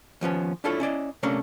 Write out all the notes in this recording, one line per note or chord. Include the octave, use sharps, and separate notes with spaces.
D#2 F3 B3 C#4
D4 E4 F4 A4 C#5
C#4 E4 D5 D#5
C3 A3 A#3 C#4 D4